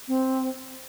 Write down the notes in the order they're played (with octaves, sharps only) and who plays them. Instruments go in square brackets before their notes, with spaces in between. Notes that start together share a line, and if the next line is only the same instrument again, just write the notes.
[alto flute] C4